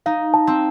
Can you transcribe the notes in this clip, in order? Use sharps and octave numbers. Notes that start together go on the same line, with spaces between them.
D#4 F5
A5
C4